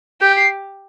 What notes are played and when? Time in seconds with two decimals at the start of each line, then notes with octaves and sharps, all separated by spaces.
0.21 G4 G6
0.36 C7